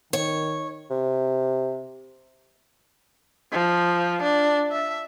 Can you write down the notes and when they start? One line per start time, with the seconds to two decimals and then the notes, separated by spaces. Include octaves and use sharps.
0.13 D#3 C#5
0.90 C3
3.52 F3
4.22 D4
4.71 E5